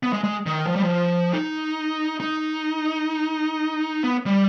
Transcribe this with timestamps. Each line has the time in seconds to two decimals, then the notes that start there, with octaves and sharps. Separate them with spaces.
0.03 B3
0.13 G#3
0.24 G#3
0.46 D#3
0.67 F3
0.76 G3
0.83 F3
1.33 D#4
2.20 D#4
4.04 B3
4.26 G3